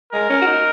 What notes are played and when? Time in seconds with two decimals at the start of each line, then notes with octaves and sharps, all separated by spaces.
0.13 G#3 A#4
0.30 C#4
0.42 F#4
0.47 D#4